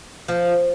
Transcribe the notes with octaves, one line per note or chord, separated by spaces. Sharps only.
F3